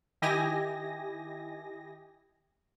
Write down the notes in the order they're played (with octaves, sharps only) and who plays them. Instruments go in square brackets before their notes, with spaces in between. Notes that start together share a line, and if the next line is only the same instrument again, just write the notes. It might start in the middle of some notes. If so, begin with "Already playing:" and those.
[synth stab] D#3 E4 G4 D#5 G#5 A#6